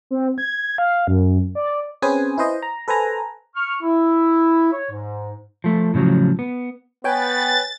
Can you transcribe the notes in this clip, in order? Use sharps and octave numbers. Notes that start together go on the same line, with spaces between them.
C4
G#6
F5
F#2
D5
C4 C#4 G#4 B4 C5 G#5
E4 B4 C5 D#5
A#5
A4 B4 C5 G#5 A#5
C#6 F6
E4
C#5
G#2
F3 A3
A2 C#3 F3 F#3
B3
B3 B4 C#5 G5 G#5 A6